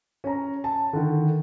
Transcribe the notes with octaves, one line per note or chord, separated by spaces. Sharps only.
C#4 A#5
A5
D3 D#3